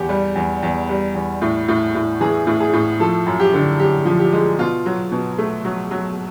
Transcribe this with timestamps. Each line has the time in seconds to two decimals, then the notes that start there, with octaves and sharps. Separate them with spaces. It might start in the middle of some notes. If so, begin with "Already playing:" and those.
Already playing: E2 G4
0.09 G3
0.36 E2
0.63 E2
0.89 G3
1.15 E2
1.42 A2
1.68 A2
1.95 A2
2.21 E3 G#4
2.47 A2
2.60 G#4
2.73 A2
3.00 F3 A4
3.26 F#2
3.40 G4
3.53 D3
3.79 F#2 G4
4.05 F3
4.19 G4
4.32 G#3
4.59 B2 F4
4.86 F#3
5.12 B2
5.38 A3
5.65 F#3
5.91 F#3